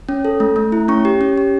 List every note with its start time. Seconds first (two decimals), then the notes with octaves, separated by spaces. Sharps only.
0.09 C#4
0.25 A4
0.40 A3
0.56 A3
0.72 E4
0.88 C#4 C#6
1.05 G4
1.21 C#4
1.38 G4